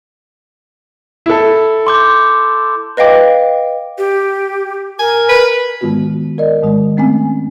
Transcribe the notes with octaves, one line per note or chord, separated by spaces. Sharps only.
E4 A4
C6 D6 G6
B4 D#5 F5 G5 D6
G4
A#4 G#5
B4
G#2 D#3 G#3 B3 F4 F#4
A#4 D5 D#5
G#2 D#3 G#3
A3 C4 C#4 G#5